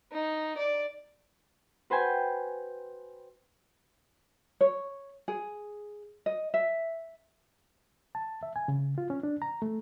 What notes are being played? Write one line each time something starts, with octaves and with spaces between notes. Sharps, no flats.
D#4
D5
F#4 B4 C5 G5 G#5
C#5
G#4
D#5
E5
A5
E5
G#5
C#3
F4
C#4
D4
A#5
A3